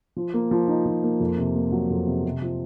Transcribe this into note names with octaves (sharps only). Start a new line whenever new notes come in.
F3
A#3
F3
D#4
F3
A#3
F2
C3
A#3
F#3
F2
C3
C3
F3